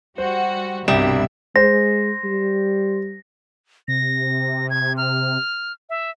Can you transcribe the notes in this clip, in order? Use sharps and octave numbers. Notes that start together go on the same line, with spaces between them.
G3 F#4 C5
C2 G2 B2 G3 E5 E7
G#3 C5 A#6
G3
C3 A#6
G#6
F6
E5